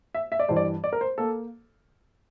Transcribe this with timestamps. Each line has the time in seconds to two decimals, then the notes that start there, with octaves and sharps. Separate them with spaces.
0.14 E5
0.32 E5
0.39 D5
0.49 G2 E3 G3 C5
0.56 D5
0.84 D5
0.93 A#4
1.01 C5
1.18 A#3 A4